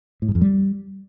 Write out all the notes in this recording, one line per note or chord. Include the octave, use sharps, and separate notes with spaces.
A2
G#2
F2
G3